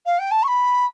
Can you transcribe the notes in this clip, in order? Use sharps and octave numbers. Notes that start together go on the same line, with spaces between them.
F5
G5
A5
C#6
B5